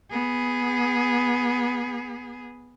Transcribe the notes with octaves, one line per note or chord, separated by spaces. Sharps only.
B3 G#4